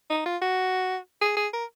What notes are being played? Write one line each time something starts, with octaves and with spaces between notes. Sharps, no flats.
D#4
F4
F#4
G#4
G#4
A#4